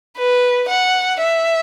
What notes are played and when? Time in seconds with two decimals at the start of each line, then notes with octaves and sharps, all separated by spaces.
0.17 B4
0.69 F#5
1.20 E5